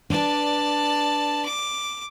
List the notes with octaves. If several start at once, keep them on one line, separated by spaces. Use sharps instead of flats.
D4 B4 D5 A5
D6